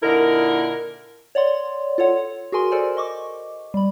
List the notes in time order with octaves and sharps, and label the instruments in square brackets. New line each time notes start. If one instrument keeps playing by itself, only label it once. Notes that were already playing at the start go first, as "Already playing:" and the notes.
[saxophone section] A#2 D3 D#4 E4 A#4
[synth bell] C#5 D5 F#5 C6
F4 A4 C#5 F#5
F#4 G#4 A#4 G#5 C6
A4 A#4 C5 D5 G#5
D#5 C#6 D6
G3 B5